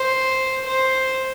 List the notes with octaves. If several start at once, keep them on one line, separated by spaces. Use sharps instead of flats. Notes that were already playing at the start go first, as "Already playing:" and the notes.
Already playing: C5
C5